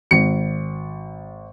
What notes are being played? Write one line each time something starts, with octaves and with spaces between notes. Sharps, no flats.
G#1 C#7